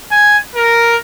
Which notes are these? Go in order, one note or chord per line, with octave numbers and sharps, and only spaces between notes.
G#5
A#4